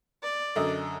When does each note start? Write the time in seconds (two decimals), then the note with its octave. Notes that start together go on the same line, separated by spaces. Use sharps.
0.23 D5
0.56 F#2 D3 D#5